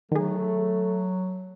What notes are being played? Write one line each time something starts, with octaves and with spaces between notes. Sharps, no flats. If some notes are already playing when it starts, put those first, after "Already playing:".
D#3 F#3 A3 G#4